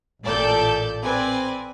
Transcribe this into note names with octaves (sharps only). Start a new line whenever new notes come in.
A1 A#2 A4 D5 A5 G6
C4 B4 D5 G#5